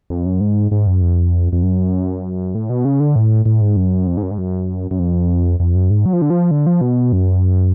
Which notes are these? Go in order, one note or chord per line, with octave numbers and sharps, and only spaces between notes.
F2
F#2
G#2
G#2
F#2
F2
F2
F#2
A2
B2
C#3
D3
A2
A2
G#2
F#2
F2
G#2
F#2
G#2
F#2
F#2
F2
F2
F#2
G#2
F#3
F3
D3
F3
D3
F3
B2
F#2